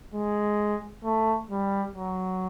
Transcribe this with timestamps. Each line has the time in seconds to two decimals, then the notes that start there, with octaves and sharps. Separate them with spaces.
0.14 G#3
1.04 A3
1.51 G3
1.96 F#3